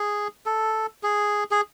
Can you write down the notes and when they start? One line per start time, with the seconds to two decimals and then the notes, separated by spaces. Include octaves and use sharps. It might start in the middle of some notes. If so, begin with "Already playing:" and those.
Already playing: G#4
0.46 A4
1.03 G#4
1.51 G#4